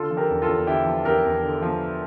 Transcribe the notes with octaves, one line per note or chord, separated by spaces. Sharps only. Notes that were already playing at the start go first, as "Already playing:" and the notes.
Already playing: D3 F4 A4
F3
G4 A#4
E2
F4 A4
E2
D3 E4 G4
F3
E2 G4 A#4
E2
D3
F3